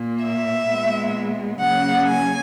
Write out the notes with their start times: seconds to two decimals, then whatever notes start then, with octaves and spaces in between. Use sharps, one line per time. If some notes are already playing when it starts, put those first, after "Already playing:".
Already playing: A#2 A#3
0.23 E5
0.69 A#2 G#3 B3
1.60 C#3 F#3 A#3 F#5
2.06 G#5